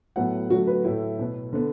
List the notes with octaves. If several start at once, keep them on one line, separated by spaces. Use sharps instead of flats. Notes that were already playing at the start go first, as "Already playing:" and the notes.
A2 F#3 B3 F#5
D3 F#3 A3 F#4
B4
A2 A3 E4
B2 B3
D3 B3